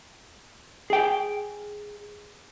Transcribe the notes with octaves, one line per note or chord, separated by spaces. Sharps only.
G#4 G5